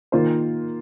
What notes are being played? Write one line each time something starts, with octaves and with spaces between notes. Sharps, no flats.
D#3 A#3 F4 C5